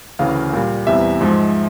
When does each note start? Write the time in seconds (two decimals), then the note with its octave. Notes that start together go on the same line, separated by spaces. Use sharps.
0.19 D2 C#3 E3 F5
0.53 A#2 G3
0.87 E2 C3 E3 G3 E5
1.21 G#2 F3 G#3